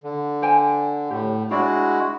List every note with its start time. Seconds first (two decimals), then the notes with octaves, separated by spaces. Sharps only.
0.04 D3
0.42 C5 G5 G#5
1.10 A2 G4
1.51 G#3 D4 E4 F#4 D5